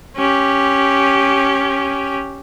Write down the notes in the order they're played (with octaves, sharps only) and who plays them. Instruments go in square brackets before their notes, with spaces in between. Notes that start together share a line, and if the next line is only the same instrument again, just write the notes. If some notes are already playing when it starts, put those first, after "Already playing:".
[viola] C#4 G4